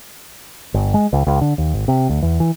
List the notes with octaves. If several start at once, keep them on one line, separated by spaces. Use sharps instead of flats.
G1
G#3
C#2
C#2
D3
D#2
G#1
C3
D2
E2
E3